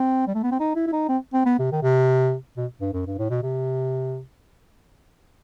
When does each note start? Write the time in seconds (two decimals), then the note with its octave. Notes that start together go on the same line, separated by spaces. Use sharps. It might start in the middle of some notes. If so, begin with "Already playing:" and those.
Already playing: C4
0.27 G3
0.35 A3
0.43 B3
0.51 C4
0.60 D#4
0.76 E4
0.87 E4
0.93 D#4
1.09 C4
1.33 C4
1.45 B3
1.59 C3
1.72 D#3
1.83 C3
2.57 B2
2.81 G2
2.93 F#2
3.07 G2
3.18 A2
3.30 B2
3.43 C3